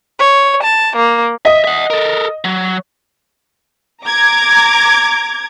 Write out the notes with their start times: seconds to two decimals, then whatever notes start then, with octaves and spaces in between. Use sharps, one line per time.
0.18 C#5
0.63 A5
0.94 A#3
1.45 D#5 E5
1.64 E5 F#5
1.90 A4 A#4
2.44 F#3
4.05 A#5 D6 G#6